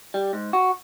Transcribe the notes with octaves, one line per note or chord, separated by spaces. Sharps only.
G3
G#2
F#4